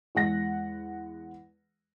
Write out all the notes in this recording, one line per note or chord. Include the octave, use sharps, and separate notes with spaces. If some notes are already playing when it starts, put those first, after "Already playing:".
E2 G#3 F#5 A#6